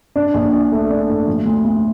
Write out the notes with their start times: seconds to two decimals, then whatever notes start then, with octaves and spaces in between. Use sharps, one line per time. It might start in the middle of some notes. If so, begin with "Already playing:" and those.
0.16 D4
0.34 A#1
0.53 D4
0.72 A3
0.90 D4
1.09 A2
1.27 F3
1.46 D2
1.64 D2